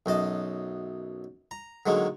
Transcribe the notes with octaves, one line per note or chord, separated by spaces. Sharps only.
B1 F#2 D#5 A5
A#5
D3 D#3 F#3 G#3 A#3